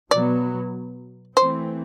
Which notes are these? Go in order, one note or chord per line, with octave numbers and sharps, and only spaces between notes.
B2 F#3 B3 D5
E3 A3 C4 C5